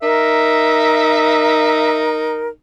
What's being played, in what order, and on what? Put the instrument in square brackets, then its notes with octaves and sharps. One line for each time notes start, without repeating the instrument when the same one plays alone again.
[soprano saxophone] D#4 [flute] A#4 [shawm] E5